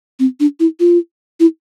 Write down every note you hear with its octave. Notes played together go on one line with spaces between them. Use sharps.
C4
D4
E4
F4
E4